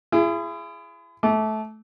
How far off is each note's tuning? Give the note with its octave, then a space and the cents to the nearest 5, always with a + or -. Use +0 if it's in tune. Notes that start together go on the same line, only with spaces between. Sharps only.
E4 +40 G#4 +0
A3 -20 D6 -25